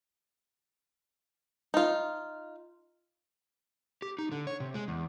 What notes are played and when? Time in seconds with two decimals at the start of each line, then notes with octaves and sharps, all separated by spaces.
1.74 D#4 F4
4.02 G4
4.19 D#4
4.32 D3
4.47 C#5
4.60 C3
4.74 G#3
4.88 E2